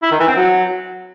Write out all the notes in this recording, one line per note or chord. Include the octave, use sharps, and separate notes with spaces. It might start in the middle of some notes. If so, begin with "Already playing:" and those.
E4
D#3
E3
C4
F#3